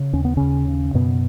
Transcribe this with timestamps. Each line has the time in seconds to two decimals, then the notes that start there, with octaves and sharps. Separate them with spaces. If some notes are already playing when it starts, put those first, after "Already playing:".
Already playing: C#3
0.13 D#2 C#4
0.25 B3
0.37 D#2 C#3 C#4
0.68 C#3
0.94 F#2 B2 B3